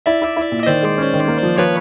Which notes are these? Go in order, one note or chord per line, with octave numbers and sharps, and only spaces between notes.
E4 D5 E5
E4
E4
A#2
D#5
D#3 C5 D5
G#3
C#4
D#3
A#3
F3
F3 B4 C#5